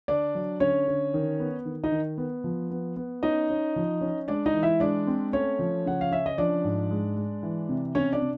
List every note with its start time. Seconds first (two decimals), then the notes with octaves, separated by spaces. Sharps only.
0.08 D3 D4 D5
0.35 F#3
0.60 D3 C#4 C#5
0.88 D3
1.14 D#3
1.40 B3
1.65 D#3
1.84 D#4 D#5
1.92 D#3
2.18 B3
2.44 F3
2.71 B3
2.96 B3
3.23 C#4 D#4 D#5
3.50 C#4
3.76 F3
4.01 C#4
4.27 G#3 D4 D5
4.46 D#4 D#5
4.54 E3
4.63 E4 E5
4.80 G#3 D4 D5
5.07 C4
5.33 A3 C#4 C#5
5.59 F3
5.86 C#3 F#5
6.01 F5
6.12 C#4 E5
6.26 D#5
6.38 F3 D4 D5
6.64 G#2
6.90 G#3
7.16 G#3
7.43 E3
7.69 C3
7.95 C3 C#4 C#5
8.13 D4 D5
8.22 C3